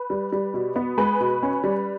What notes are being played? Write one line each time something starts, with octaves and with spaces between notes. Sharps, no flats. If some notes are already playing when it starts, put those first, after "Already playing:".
Already playing: B4
G3
G3
B2
B3
G#3 B4
B2
C#4
G3